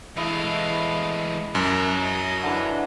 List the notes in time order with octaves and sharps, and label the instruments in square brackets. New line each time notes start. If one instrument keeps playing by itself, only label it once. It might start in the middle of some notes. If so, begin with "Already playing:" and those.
[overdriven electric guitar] E3 G#3 [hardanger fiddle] A3 F5 [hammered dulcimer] E4 D#5
[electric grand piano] F#2 [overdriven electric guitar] F#3 [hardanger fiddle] A#4 A5
[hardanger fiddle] D#5
[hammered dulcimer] D3 E3